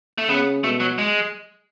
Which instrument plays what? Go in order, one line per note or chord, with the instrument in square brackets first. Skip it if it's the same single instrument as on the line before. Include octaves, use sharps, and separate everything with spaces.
[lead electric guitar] A3
[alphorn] C#3 [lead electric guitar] B3
[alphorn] B2 [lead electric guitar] A3
[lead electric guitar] F#3
G#3